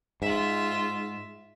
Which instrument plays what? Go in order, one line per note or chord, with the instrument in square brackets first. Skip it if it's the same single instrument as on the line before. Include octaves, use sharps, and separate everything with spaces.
[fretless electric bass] G#2 [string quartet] F4 E5